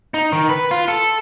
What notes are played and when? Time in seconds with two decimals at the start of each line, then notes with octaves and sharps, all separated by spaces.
0.14 D#4
0.33 D#3
0.49 B4
0.71 F4
0.88 A4